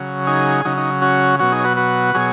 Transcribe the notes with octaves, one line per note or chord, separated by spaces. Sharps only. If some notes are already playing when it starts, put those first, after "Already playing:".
Already playing: C#3 F#3
D#4 G#4
C#3 F#3 D#4
D#4
C#4 F#4
B2 F#3 C#4 F#4
D#4 G#4
C#5
F#4 B4
F#4 B4
B2 F#3 G#4 C#5